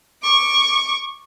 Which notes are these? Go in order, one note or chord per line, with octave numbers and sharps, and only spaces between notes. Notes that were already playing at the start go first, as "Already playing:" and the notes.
C#6 D6